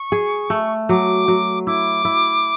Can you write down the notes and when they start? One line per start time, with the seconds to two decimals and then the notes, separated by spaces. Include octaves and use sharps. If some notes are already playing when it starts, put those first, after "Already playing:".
Already playing: C#6
0.12 G#4
0.50 A3
0.89 F#3 D6
1.28 F#3
1.67 E4 D6
2.05 E4